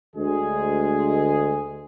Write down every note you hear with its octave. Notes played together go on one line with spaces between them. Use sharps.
D2 G#3 G#4